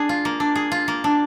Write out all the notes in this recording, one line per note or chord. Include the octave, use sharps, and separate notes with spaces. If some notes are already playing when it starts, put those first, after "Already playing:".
Already playing: D4 G#4
F4
A#3
D4
G#4
F4
A#3
D4